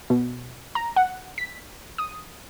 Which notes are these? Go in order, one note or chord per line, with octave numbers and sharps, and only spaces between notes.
B2
A#5
F#5
B6
D#6